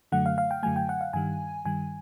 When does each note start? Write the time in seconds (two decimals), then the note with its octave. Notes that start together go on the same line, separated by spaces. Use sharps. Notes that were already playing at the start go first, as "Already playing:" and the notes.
0.12 F#2 D3 F#3 A3 F#5
0.26 F5
0.38 F5
0.51 G5
0.63 F#2 D3 F#3 A3 G#5
0.76 G5
0.89 F#5
1.01 F5
1.13 G2 D#3 G3 G#5
1.65 G2 D#3 G3 G#5